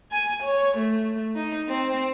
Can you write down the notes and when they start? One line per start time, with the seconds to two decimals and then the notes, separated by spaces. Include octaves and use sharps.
0.12 G#5
0.43 C#5
0.78 A3
1.36 D#4
1.69 C4